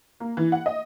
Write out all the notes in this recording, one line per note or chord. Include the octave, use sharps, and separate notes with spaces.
A#3
E3
F#5
D#5